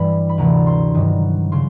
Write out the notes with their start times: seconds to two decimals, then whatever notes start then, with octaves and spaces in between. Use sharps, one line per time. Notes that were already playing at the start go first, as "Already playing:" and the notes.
Already playing: G2 E3 G3 B5
0.29 B5
0.38 D2 C3 E3 A#5
0.66 C6
0.95 G2 D#3 F#3
1.52 C#3 C6